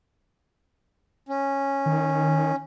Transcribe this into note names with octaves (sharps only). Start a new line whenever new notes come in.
C#4
D#3